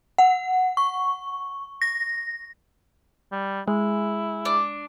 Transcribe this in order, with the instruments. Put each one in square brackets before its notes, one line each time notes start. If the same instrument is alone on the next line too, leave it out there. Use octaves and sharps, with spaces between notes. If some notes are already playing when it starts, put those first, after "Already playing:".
[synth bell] F#5
C#6
A#6
[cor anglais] G3
[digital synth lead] G#3 [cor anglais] E4
[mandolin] D4